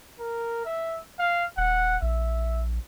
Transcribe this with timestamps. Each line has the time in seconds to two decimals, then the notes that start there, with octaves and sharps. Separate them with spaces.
0.20 A#4
0.65 E5
1.19 F5
1.57 D#1 F#5
2.02 A#1 E5